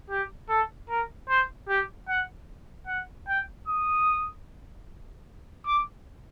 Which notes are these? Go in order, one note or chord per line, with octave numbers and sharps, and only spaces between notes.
G4
A4
A#4
C5
G4
F#5
F#5
G5
D#6
D6